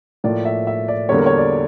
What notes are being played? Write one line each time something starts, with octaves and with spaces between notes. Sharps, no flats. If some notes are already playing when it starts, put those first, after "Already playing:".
A2 F3 A#3 D5
E5
E5
D5
E2 D3 G3 A#3 C#5
A#4
C#5
D5